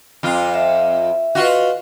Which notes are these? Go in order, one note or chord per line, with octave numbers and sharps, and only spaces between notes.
F2 F4
E5
F4 F#4 B4 D#5 F5